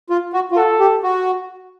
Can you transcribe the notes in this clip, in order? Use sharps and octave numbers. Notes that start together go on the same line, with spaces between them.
F4
F#4
F4
F#4 A4
G4
F#4